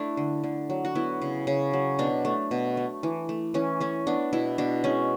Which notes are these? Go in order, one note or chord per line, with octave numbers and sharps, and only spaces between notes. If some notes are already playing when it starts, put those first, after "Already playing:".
Already playing: A3 D4 E4
D3
D3
F#3
F#4
B3 E4
C#3
C#3
F#3
B2 D4
A3
B2
A3
E3
A3
E3 C#4
A3 C#4
B3 D4
B2 E4
B2 D4
G#3 C#4